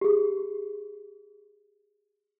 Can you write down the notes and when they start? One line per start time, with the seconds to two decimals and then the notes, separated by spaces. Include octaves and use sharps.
0.01 G4 G#4